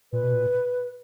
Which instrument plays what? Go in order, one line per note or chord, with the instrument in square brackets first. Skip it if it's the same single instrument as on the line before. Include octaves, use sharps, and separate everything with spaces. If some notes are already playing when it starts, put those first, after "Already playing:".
[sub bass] A#2 [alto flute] B4
[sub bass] B2
A#2